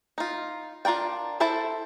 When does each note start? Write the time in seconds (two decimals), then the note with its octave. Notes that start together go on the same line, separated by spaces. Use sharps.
0.18 D#4 F4
0.85 D4 F4 A#4 D5 G5
1.40 E4 A4 C5 E5 A5